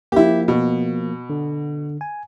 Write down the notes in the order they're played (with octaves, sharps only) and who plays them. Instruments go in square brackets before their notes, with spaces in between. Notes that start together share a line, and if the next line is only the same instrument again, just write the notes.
[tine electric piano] F3 A#3 [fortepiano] E4 G4
[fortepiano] B2
[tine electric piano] D3
G#5